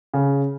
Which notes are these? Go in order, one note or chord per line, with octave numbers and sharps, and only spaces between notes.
C#3